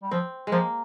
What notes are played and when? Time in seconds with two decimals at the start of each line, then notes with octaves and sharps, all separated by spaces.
0.02 G3
0.11 F3 C4
0.47 F3 G#3 A#3